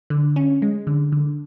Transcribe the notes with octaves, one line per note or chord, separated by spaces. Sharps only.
D3
C#4
G#3
D3
D3